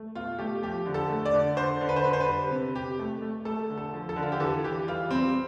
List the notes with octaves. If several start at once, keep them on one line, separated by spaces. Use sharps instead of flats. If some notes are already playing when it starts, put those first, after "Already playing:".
Already playing: A3
B2 F4
A3 G4
F3 G4
D3
A4
A3
D5
D3
D3 C5
D3
B4
C5
D3 B4
C5
B4
G3
C3
C3 G4
A3
A3
A3 A4
D3
A4
F3
A4
D3
F4
G4
E3 A4
E3 G4
G3 F4
G3 C4